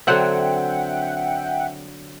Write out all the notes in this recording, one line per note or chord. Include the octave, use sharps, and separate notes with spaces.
D3 F#3 C4 E5 F#5 G5